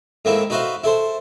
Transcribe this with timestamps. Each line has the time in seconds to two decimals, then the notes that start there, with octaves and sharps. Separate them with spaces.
0.25 G#2 A3 A#3 C4 E4
0.50 D#4 F#4 B4 C5 E5 F5
0.84 E4 A4 C5